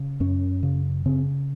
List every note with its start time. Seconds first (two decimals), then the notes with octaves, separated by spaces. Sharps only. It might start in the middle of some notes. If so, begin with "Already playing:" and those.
Already playing: C#3
0.20 F#2 C#4
0.63 C#3
1.06 C#3 C4